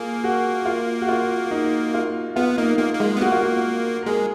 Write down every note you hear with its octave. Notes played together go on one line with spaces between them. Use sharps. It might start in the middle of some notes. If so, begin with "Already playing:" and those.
Already playing: A#3 F4 G#4
F#4
F4
F#4
F4
D#4
F4
B3 F4
A#3 D#4
A#3 F4
A#3
G#3 F4
B3
A#3 F#4
F4
F#4
A#4
G#3 G#4